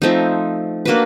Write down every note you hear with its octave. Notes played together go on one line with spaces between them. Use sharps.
F3 A3 C4 D#4
A#3 D4 F#4 B4